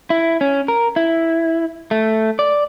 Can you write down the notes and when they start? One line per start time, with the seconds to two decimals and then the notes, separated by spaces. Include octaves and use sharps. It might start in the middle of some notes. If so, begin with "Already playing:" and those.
0.10 E4
0.41 C#4
0.68 A#4
0.96 E4
1.91 A3
2.39 D5